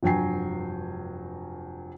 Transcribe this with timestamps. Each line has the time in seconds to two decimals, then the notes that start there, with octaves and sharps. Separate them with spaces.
0.03 F1 G2 F#3 G5 G#5 C7